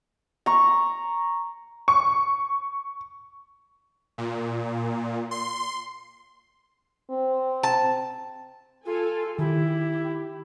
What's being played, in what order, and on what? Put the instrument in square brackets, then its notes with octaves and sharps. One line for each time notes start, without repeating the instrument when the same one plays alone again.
[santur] A#5 C#6
[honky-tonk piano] C#6
[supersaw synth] A#2
C6
[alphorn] C4
[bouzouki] A5
[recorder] F4 [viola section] A4 G#5
[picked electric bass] D#3 [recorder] E4 [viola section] G4